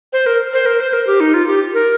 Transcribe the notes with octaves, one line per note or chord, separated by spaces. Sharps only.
C5
A#4
C5
A#4
C5
A#4
G4
D#4
F4
G4
A#4